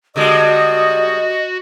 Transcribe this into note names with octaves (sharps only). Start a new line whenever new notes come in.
D3 G3 G#3 F#4 D#5 D#6